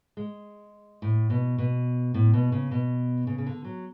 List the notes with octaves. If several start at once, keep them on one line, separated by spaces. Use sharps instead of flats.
G#3
A2
B2
B2
A2
B2
C#3
B2
C#3
C#3
D3
F#3